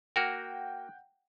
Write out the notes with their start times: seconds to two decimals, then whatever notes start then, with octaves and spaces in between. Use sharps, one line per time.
0.16 A#3 F#4 A#4 F#5 G5